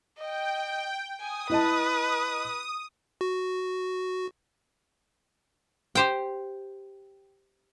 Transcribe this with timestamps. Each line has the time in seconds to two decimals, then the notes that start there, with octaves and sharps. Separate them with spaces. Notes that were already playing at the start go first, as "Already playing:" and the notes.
0.19 D#5 G5
1.21 G#5 D#6
1.50 E4 B4 D#5 A5
3.21 F#4
5.95 G4 C5 G5